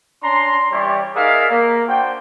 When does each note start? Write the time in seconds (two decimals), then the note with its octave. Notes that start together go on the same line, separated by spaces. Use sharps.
0.23 C#4 D4 A#5 C6
0.72 E3 G3 E4 G4 C#5 D5
1.15 D#4 G#4 A#4 D5 E5 F5
1.50 A#3
1.88 D4 F#4 C5 G5